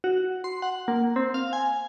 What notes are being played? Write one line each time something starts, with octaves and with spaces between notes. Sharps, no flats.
F#4
C6
F#5
A#3
C4
F5
G#5